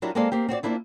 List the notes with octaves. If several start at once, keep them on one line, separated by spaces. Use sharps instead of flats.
F#3 D4 E4 F4 G4 A#4
G#3 A#3 C4 A4 D5 F5
A#3 C4 G4
C4 F#4 C#5 D5
A#3 C4 D4 E4 F4